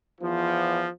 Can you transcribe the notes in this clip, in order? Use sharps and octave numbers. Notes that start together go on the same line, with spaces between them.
E2 F3